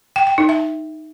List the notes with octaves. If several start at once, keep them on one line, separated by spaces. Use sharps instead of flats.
G5
G5
D#4
E5